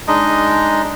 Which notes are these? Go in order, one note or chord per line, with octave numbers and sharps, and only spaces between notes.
G#3 D4 D#4 D#5